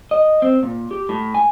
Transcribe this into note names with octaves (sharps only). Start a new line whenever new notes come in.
D#5
C4
A#2
G4
A2
G#5